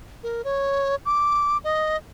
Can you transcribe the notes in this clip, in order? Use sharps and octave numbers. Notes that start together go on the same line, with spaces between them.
A#4
C#5
D6
D#5